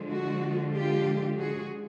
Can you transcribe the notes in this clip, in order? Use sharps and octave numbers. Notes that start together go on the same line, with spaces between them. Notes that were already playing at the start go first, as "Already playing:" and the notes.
Already playing: D3 F3 G#3
F#4
F4 G4
F#4 G#4